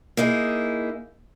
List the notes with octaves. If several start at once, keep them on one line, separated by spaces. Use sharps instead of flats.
A#3 D#4 E4 G#4